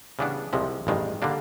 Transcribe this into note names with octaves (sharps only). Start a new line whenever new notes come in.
C#3 E3 G3 B3 D4
C2 C3 F3 G#3
A1 G2 D#3 G#3
D3 G3 A#3 D4